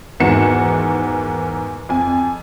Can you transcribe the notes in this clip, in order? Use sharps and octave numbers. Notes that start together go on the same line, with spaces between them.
E2 G#2 D#3 F#4 C#7 E7
F2 G#5